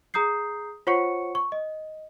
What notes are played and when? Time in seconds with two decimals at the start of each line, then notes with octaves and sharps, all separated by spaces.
0.14 G#4 A#5 D#6 G6 C7
0.87 F4 C5 C#5 F#5 C#6 C#7
1.35 C#6
1.52 D#5